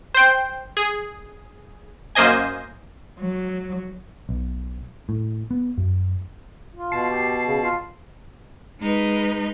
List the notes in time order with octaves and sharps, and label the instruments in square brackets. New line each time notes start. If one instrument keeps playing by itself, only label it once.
[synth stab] C5 G5
G#4
F#2 A#3 C5 D#5 G#5
[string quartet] F#3
[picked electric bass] B1
A2
B3
F#2
[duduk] F4
[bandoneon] B2 A5 [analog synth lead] C7
[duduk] G4
C#3
F4
[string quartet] G#3 D#4 B4